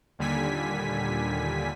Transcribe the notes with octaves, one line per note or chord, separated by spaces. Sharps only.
D#2 A#2 D3 G3 G#5 B6